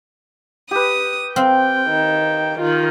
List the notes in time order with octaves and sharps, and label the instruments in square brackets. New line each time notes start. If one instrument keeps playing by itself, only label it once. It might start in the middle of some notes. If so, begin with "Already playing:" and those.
[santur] G4 B4 [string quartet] D#6
[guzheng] C4 [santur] F5 [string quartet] G5
[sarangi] D#3
[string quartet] D#3 [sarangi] F4